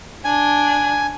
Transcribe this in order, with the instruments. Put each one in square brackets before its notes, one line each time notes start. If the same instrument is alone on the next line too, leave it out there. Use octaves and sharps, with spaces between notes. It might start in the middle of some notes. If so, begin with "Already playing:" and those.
[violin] D4 [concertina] G#5